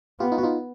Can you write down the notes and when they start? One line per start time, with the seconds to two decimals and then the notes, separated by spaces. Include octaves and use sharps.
0.20 B3 F4 G4
0.32 D#4 F4
0.38 F#4
0.43 D#4 F4